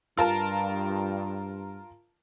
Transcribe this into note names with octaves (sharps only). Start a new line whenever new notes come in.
G2 F4 A#4 A5